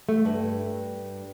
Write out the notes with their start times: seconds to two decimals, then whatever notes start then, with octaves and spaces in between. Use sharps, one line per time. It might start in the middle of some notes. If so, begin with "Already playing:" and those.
0.09 A3
0.25 G2